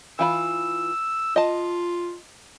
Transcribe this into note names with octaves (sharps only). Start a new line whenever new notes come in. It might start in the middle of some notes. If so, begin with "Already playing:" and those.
E3 F4 B5 E6
F4 D#5 A5